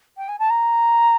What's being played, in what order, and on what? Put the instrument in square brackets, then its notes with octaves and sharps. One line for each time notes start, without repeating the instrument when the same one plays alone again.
[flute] G5
G#5
A5
A#5